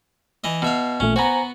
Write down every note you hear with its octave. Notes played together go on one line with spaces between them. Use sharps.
E3 D#5
B2 E5 F5
A1 A#2 A3 C#4
B3 F#4 C5 G#5 A#5